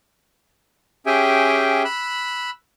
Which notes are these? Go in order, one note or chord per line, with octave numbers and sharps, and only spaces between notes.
C#4 G4 G#4 E5 G5 G#5
B5 E6 F#6